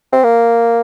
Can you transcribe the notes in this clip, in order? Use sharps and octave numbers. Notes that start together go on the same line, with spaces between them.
C4
A#3